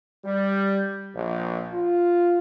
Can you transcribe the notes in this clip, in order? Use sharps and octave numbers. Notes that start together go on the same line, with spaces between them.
G3
A#1
F4